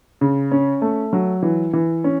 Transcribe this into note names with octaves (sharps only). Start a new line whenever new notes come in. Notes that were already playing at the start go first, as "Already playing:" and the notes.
C#3
C#4
A3
F#3
E3
E3
C#4